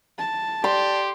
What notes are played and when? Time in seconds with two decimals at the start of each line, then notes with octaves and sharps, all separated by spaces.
0.18 A5
0.64 G4 D5 C6